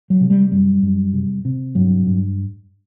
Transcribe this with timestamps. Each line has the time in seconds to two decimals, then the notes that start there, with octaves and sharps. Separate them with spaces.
0.10 F#3
0.21 C3
0.30 G3
0.52 F#2 G3
0.82 F#2
1.14 C3
1.45 C3
1.75 G2 F#3
2.07 G2